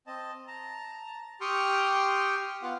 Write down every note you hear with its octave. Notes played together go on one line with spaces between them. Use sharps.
C4 D#5 A5
A5 A#5
G4 G5 C6 C#6 D#6 F6
B3 F4 F5 F#5